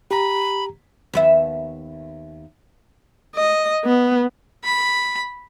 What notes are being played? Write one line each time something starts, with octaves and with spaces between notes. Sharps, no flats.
G4 A#5 B5
D#2 B3 E5
D#5
B3
B5